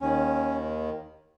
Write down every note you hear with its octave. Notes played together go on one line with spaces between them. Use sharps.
D#2 D#3 C#4